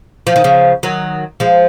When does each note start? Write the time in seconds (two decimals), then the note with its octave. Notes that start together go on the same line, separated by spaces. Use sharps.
0.27 F3
0.36 D#3
0.44 C#3 F3
0.83 D#3 F#3
1.40 F3 G#3